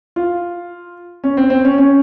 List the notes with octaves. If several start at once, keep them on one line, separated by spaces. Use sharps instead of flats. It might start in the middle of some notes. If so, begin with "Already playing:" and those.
F4
C#4
C4
C4
C#4
C#4